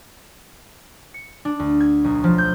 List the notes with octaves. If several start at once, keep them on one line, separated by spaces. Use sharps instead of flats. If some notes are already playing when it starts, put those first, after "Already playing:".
C#7
D4
D2
G#6
B1
F3
G6